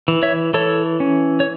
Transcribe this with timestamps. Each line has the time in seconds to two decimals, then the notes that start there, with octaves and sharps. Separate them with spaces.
0.08 E3
0.23 C#5 E5
0.54 E3 A4 C#5
1.00 C#4
1.40 C#5